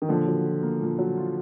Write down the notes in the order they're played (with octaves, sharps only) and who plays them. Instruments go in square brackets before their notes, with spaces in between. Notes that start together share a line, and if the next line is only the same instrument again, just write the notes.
[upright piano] D#3
[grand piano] A#2 [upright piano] D3 F3
[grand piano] F#3
F4
A#3
A#2
F#3
F4